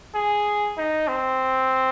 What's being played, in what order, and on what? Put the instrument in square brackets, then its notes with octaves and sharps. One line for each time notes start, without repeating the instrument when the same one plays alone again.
[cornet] G#4
D#4
C4